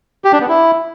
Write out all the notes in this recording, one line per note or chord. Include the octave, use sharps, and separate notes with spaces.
G4
D4
B3
E4